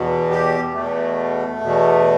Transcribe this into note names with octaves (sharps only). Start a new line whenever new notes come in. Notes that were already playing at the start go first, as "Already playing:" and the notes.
Already playing: E2 B2
G4
E2 B2 A3
E2 B2